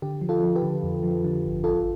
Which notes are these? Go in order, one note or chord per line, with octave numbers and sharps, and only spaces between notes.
D3 G4
F3
F4 A4
F3
G4 B4
D3
F2
F3
D3
G1
A1 F4 A4